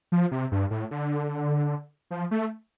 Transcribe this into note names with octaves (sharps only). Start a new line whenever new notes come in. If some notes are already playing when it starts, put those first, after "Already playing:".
F3
C3
G2
A2
D3
F3
A3